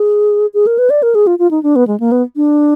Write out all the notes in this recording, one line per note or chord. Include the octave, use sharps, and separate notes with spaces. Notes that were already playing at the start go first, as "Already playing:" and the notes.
Already playing: G#4
G#4
A#4
B4
D5
A#4
G#4
F4
F4
D#4
D4
B3
G#3
A#3
B3
D4